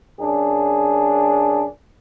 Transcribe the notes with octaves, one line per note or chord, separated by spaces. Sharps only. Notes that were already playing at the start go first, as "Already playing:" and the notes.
F#2 D4 G#4